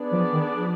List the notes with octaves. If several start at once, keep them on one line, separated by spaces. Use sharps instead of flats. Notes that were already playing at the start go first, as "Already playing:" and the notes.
Already playing: B3 D4 G#4 D5
F3
D#3
F3